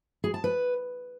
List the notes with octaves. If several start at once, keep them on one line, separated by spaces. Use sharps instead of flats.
G#4
A5
B4